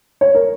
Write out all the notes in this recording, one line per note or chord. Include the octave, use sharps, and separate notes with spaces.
C#5
A#4